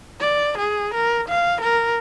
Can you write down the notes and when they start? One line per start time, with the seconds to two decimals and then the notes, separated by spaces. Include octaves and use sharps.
0.21 D5
0.58 G#4
0.94 A#4
1.29 F5
1.61 A#4